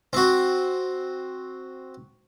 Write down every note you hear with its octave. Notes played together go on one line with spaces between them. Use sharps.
C4 F#4